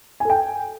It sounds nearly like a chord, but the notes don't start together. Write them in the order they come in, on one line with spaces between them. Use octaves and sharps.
G#5 A4 G5